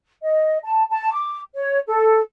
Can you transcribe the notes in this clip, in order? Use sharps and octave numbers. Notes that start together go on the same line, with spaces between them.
D#5
A5
A5
D6
C#5
A4